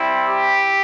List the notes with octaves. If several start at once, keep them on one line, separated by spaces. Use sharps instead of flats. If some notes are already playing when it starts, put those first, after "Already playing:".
Already playing: G3 C4 E4
G4